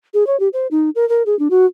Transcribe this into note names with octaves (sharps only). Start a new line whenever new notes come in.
G#4
C#5
G4
C5
D#4
A#4
A#4
G#4
D4
F#4